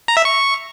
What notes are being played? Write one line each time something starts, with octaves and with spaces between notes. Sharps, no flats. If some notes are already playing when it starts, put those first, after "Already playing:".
A#5
E5
C#6